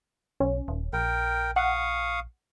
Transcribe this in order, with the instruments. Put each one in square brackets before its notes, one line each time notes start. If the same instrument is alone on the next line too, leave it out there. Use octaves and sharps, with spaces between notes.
[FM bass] B1 [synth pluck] C#4
[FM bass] D#1
[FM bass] A#1 [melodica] A#4 G5
[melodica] F5 C#6 D#6 [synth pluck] F#5